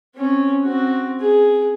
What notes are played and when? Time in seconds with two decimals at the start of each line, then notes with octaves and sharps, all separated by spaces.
0.15 C4 C#4
0.64 C4 F#4
1.20 G#4